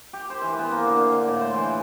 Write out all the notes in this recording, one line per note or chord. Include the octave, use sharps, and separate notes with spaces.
G4
C5
E3
B3
A#3
D3
F5
D3
A2
C5
E3
G#4